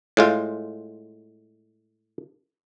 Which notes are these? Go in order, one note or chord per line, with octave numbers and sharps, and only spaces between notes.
A2 G#3 F4